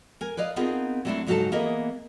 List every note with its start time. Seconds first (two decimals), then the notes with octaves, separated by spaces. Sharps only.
0.21 A#4 G#5
0.37 B4 D5 D#5 F5
0.56 B3 C4 D#4 F4 G#4 A#4
1.05 F#3 G3 A3 C4 D4 E4
1.27 G#2 C#3 F#3 D#4 A4 A5
1.52 E3 A#3 B3 G#4 A#4 D#5